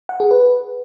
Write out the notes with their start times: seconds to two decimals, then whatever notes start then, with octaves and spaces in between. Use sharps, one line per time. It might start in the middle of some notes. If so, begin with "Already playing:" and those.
0.09 F#5
0.20 G#4
0.31 B4